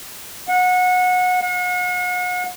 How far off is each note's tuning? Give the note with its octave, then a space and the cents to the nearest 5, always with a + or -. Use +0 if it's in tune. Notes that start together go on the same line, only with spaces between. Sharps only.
F#5 -25
F#5 -40